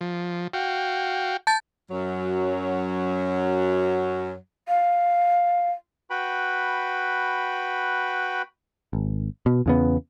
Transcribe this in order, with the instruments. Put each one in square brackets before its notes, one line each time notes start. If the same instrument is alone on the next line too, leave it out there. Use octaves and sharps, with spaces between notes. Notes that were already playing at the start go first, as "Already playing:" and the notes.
[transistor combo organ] F3
F#4 F5 G5
[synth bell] A5 G6 A6
[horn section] F#2 F#3
[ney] F5
[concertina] F#4 B4 G5 B5
[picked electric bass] G#1
B2
E2 C#3 B3